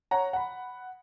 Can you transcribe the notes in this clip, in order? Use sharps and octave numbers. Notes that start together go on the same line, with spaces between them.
C#5 F#5 A#5
F#5 B5